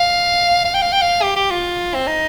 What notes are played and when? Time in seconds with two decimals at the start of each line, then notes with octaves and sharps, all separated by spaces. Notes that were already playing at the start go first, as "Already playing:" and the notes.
Already playing: F5
0.65 F5
0.74 G5
0.82 F5
0.92 G5
1.02 F5
1.22 G4
1.36 G4
1.50 F4
1.95 C4
2.07 D#4